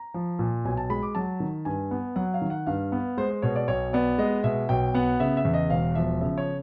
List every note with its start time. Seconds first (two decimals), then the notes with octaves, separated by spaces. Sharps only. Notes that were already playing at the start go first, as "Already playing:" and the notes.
Already playing: A#5
0.14 F3
0.39 A#2
0.65 B1 G#5
0.77 A5
0.90 G#3 B5
1.03 D6
1.15 F#3 A5
1.40 D#3
1.65 G2 G#5
1.91 B3
2.16 F#3 F#5
2.34 F5
2.42 D#3
2.50 F#5
2.66 G2 F5
2.92 B3
3.17 G#3 C5
3.31 C5
3.42 B2 C#5
3.56 D5
3.68 B1 C#5
3.93 B3 D5
4.18 G#3 D#5
4.44 B2 E5
4.69 B1 G5
4.95 B3 F#5
5.20 C#3 E5
5.37 E5
5.45 E2
5.54 D#5
5.70 E1 F5
5.95 F3 E5
6.21 C#3 E5
6.38 C#5